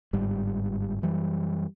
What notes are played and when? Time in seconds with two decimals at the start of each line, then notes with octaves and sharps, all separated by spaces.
0.13 G1 G#2 G3
1.02 F#2 E3 G3